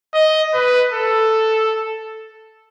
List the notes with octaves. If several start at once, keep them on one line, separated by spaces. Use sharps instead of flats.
D#5
B4
A4